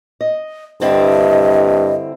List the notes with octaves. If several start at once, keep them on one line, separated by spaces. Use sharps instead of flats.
D#5
G2 D3 C4 E4 D#5